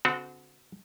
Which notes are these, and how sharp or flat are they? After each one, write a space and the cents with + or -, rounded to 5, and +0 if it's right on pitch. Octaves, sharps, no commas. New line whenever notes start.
D3 -40 C4 -35 F#4 -15